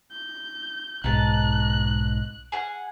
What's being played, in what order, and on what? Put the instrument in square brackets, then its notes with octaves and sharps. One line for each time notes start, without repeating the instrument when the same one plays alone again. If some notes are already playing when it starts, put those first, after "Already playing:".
[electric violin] G6
[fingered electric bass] B1 G#2 [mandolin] D#4 A5 [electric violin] F#6
[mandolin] G#4 F#5